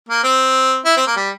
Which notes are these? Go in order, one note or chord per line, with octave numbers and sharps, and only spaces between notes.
A#3
C4
E4
C4
A#3
G3